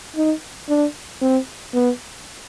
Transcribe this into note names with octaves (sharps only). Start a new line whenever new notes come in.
D#4
D4
C4
B3